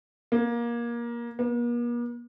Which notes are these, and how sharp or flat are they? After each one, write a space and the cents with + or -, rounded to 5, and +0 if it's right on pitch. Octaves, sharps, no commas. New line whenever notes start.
A#3 +20
A#3 +45